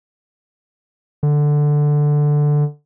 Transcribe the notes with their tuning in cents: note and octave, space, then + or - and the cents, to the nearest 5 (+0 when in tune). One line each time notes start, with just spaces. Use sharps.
D3 +5